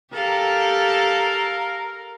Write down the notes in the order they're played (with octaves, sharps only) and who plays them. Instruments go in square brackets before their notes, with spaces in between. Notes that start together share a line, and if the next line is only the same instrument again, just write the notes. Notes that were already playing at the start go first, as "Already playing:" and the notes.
[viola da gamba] G4 A4 [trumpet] A#4 [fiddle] F5